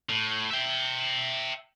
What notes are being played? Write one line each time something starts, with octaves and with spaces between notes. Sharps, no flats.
A2
E5 G5